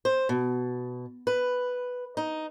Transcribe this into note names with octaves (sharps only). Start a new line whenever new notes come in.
C5
B2
B4
D#4